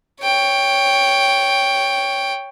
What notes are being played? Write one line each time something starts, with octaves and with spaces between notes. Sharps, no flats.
C#5 G5